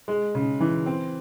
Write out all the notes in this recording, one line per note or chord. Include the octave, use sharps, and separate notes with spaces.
G#3
C#3
E3
C4